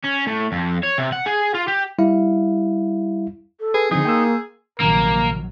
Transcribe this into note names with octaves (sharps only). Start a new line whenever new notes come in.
C#4
A2
F2
C#5
C3
F#5
G#4
F4
G4
G3 E4 F5
A4
G#4 B4
D3 F3 C4 D#4 G#4
A#3 G5 C6 E6
A#1 C3 D#3 F#3 A#3 A#4